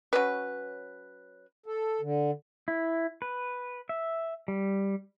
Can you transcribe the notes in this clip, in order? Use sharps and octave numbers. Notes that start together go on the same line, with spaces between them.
F#3 C#4 B4
A4
D3
E4
B4
E5
G3